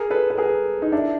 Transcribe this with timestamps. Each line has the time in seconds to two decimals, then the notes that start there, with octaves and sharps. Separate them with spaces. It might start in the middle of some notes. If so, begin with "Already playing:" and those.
Already playing: G#4 A#4
0.10 A4 B4
0.30 B4
0.38 G#4 A#4
0.82 D#4
0.92 D4 E4